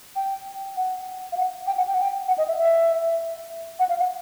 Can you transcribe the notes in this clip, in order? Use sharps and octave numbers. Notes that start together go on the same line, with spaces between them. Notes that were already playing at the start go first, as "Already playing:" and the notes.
G5
F#5
F5
F#5
G5
F#5
G5
F#5
G5
F#5
D#5
E5
E5
F#5
F5
F#5